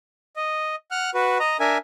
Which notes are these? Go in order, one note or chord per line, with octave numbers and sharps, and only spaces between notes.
D#5
F#5 F6 F#6
F#4 B4
D#5 A#5
D4 A#4 E5 G#5